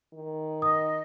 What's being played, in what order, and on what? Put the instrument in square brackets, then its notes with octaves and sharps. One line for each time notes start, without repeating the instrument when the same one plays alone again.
[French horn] D#3
[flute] D#5 [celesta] D#6